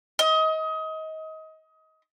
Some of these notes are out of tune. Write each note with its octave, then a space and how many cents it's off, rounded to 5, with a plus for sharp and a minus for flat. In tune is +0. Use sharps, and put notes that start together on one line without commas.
D#5 +25